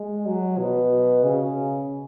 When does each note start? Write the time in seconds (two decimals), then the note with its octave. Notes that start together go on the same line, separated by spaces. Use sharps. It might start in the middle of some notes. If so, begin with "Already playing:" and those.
Already playing: G#3
0.26 F#3
0.58 B2
1.23 C#3